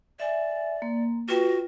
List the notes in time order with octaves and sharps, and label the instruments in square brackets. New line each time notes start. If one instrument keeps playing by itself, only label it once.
[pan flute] D5 [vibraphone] E5 G#5
[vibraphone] A#3
[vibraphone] F4 B4 G5 [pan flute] F#4